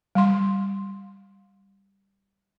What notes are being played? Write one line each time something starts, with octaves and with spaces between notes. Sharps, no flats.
G3 C6